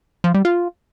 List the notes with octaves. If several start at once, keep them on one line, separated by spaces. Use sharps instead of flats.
F3
G3
F4